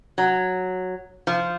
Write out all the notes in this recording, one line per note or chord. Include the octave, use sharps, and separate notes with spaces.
F#3
F3